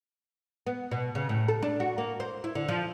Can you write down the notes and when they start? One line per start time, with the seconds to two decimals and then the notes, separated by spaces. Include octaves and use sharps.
0.67 B3
0.91 B2
1.15 C#3
1.29 A2
1.48 A4
1.62 D4
1.80 F#4
1.98 A#3
2.20 C5
2.44 E4
2.55 D3
2.68 F3